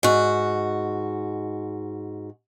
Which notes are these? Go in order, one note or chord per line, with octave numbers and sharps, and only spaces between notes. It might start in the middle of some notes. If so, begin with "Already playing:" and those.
G#2 F#4